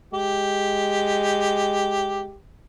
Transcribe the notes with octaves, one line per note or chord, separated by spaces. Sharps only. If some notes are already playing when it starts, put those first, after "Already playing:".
G#3 G4